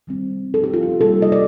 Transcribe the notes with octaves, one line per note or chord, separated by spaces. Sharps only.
D#3 G3 C4
A4
G4
F4
G4
C3 D#3 G3 A#3 A4
D#5
D5